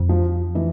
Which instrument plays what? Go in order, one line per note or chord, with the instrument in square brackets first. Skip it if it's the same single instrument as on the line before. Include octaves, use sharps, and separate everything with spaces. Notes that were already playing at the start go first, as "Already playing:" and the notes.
Already playing: [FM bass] F2
[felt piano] F3
E3